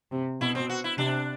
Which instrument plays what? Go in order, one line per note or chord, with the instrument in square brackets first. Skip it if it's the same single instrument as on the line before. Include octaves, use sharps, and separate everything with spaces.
[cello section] C3
[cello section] B2 [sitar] E4
[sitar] C4
F#4
E4
[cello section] C3 [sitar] D4